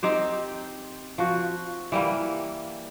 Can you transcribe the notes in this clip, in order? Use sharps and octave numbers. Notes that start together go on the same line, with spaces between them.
C4 D#4 G4 C5
F3 F#4
E3 G3 A#3